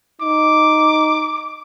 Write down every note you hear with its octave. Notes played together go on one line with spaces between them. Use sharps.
D#4 D6